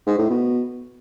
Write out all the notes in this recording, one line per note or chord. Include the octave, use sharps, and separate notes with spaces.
G#2
A2
B2